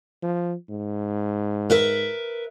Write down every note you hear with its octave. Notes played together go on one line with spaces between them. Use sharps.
F3
G#2
A#4 B4 E5